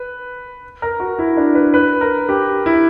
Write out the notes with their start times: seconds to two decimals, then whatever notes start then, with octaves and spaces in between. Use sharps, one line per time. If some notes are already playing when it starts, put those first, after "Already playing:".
Already playing: B4
0.82 A#4
1.00 F#4
1.19 E4
1.37 D4
1.55 B4
1.74 B4
2.01 A#4
2.29 G4
2.66 E4